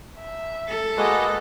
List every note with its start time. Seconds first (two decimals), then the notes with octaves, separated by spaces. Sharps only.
0.20 E5
0.68 A4
0.97 G#3 A#3 F#4 B4 D#5